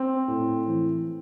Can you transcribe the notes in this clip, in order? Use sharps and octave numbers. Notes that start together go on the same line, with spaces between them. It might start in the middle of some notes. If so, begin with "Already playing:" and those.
Already playing: C4
A2
E3